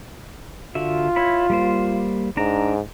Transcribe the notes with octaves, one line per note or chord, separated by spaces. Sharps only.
D3 F4 F#4 E5
E4 C#5 B5
G3 A#3 C5
G#2 D4 A#5